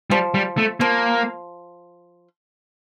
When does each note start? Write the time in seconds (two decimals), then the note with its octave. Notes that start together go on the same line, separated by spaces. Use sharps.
0.10 F3 G3
0.34 G3
0.58 A3
0.80 F3 A#3